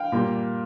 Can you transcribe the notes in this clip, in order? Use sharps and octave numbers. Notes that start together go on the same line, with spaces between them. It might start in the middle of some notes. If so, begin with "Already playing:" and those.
Already playing: F5 G5
A#2 G3 A#3